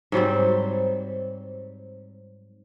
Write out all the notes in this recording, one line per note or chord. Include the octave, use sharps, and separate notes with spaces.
G#2 F#3 G3 C4